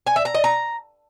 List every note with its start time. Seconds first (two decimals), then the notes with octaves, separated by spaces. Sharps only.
0.07 G#5
0.16 E5
0.25 A#5
0.35 D#5
0.44 A#5